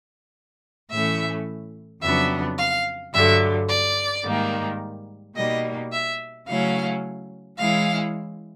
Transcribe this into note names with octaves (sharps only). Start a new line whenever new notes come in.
A2 E3 A3 C#4 E5
F2 C#3 F#3 B3 D4 E5
F5
G2 D3 F#3 E5
D5
G#2 D#3 G3 A#3
B2 G3 A#3 D#4 D#5
E5
C#3 F#3 A3 C#4 E4 F5
E3 G#3 C#4 E4 F5